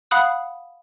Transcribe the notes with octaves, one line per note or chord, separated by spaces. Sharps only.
F5 F#5 B5 D#6 F#6